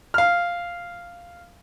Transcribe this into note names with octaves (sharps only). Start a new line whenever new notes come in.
F5 F6